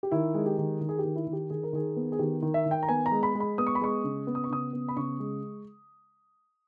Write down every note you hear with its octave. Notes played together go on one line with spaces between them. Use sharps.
G4
D#3 E4
G#3
G4
D#3
D#3
G#4
G4
D#3
E4
D#3
G4
D#3 G#4
A#4
D#3 G#4
B3
G#4
D#3 G4
D#3
E5
D#3
G5
A#5
B3 G#5
A#5
G#3
B5
G#3
B5
B3 D#6
C#6
B5
G#3 C#6
C#3
B3
D#6
C#6
C#3 D#6
B3
B5
C#3 C#6
G#3